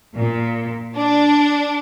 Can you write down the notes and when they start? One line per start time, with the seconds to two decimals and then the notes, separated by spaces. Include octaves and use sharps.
0.16 A#2
0.95 D4